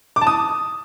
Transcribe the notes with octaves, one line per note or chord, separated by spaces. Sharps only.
D6
A5
D#6